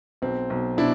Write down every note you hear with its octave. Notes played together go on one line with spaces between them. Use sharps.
B1 C4
B1
B2 D4 E4